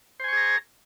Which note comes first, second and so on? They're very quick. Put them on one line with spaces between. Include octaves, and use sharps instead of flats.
C5 G#5 C#6 G#4 A#5